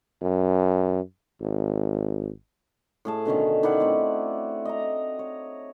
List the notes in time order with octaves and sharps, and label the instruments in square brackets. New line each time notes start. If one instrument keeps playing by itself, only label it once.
[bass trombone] F#2
G#1
[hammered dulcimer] A2 G#4 A5
B2 D3 D#3 C#4
D#3 E4 D5 F#5
A3 C4
D#5 A#5
C#5